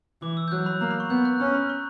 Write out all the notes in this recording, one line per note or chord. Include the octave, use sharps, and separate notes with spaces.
E3 D6
E6
G6
F#3 F#6
B5
A#3 A#5
B5
C#6
B3 G6
F#6
C#4 B5
B5
C#6